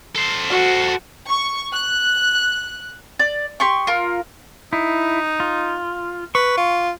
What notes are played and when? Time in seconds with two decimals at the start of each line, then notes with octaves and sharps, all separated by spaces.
0.15 A4 C5
0.50 F#4
1.28 C#6
1.72 F#6
3.19 D5
3.60 G4 C6 C#6
3.87 F4 A#4
4.73 D#4 E4
5.40 F4
6.35 B4 C#6
6.57 F4